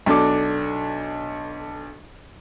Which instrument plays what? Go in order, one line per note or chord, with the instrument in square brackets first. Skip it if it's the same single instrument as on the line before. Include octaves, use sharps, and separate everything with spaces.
[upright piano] B1 D4 A4 D6